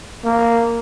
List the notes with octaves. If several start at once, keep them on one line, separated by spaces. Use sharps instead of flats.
A#3